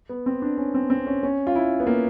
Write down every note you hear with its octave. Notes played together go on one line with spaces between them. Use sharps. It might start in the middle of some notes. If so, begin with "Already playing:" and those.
B3
C4
D4
C#4
C4
C4
C#4
C#4
F4
E4
B3
A#3